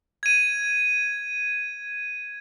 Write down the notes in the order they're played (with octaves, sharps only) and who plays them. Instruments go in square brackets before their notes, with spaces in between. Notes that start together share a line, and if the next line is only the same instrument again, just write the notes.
[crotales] G#6 D#7